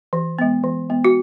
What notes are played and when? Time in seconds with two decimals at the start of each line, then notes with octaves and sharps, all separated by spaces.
0.13 E3
0.39 G#3 B3
0.63 E3
0.90 G#3 B3
1.05 F#4